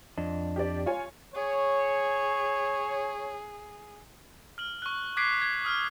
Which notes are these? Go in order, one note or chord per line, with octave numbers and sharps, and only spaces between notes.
F2 D4 D#5
G4 D5
F4 C#5 G#5
G#4 C#5
F6 F#7
C#6 F#6
D6 F#6 G#6 B6 C7 D7
G#6
D#6 F6